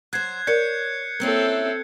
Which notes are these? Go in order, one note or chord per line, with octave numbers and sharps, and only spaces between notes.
F#3 C5 F#6 G#6 C7
A#4 C#5 D5 G6 G#6 C#7
A#3 C4 C#4 E4 A4